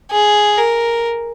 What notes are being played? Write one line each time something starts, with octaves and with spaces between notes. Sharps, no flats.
G#4
A#4